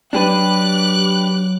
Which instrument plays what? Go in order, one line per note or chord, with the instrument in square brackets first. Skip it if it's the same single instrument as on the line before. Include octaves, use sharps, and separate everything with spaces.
[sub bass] F#3 [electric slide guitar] D4 G4 B4 [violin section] D6 F#6